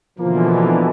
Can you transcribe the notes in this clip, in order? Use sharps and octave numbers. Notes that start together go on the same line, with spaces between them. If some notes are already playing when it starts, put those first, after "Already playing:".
B2 D3 E3 F3 A#3